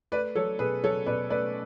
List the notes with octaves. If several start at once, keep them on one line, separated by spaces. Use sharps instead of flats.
A3 B4 D5
F#3 A4 C#5
B2 G#4 B4
F#3 A4 C#5
B2 B4 D5
A3 B4 D5